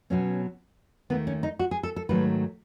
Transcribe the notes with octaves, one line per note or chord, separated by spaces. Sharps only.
B2 F#3 B3 C#4
D#2 D#3 A3 B3
C#4
D#4
F#4
G#4
A4
A4
G#2 D#3 F#3 A3 B4